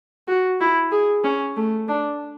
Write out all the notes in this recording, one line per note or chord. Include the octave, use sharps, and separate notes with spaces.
F#4
E4
G#4
C#4
A3
D4